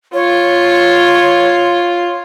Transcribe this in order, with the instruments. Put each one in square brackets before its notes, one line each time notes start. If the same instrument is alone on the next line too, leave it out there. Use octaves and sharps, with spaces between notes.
[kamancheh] F4 [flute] C#5